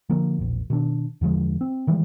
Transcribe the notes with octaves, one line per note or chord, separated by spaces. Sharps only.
D3 F3 A#3
E1 A#1
B2 D#3 D4
E2 D3 F3 G#3
C4
D#3 E3 G3 G#3